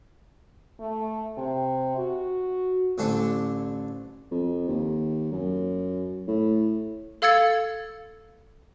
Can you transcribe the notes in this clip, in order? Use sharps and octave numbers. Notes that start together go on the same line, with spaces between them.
A3
C3
F#4
A1 D3 C4 D4 A4 G#5
F2
D#2
F#2
A2
A4 F5 E6 G#6 A6 C#7